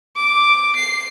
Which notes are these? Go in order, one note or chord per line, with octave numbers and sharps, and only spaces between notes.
D6
C7